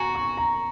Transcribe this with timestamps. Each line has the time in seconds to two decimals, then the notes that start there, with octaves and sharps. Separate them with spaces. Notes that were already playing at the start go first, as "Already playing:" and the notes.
Already playing: F#4 G#5 A#5 C#6
0.15 C#6
0.37 A#5